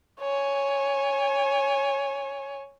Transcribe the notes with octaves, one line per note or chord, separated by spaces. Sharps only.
C#5 G#5